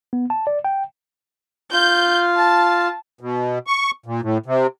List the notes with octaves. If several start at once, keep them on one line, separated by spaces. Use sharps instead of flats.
B3
A5
D5
G5
F4 G6
A5
B2
C#6
A#2
A2
C3